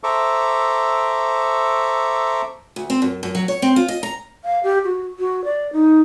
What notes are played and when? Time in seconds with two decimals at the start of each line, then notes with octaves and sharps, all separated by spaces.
0.04 A4 C5 E5 A#5 C#6 D6
2.76 D2
2.90 C4
3.02 F#2
3.23 F#2
3.35 F#3
3.48 C#5
3.62 C4
3.76 F4
3.88 D#5
4.03 A#5
4.45 F5
4.63 G4
4.85 F#4
5.19 F#4
5.44 D5
5.73 D#4